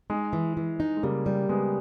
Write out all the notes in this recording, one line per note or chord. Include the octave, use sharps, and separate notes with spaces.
G#3 D#4
E3
E3
D#4
G#3
C#3 G3 A#3
G3
C#3 G#3 B3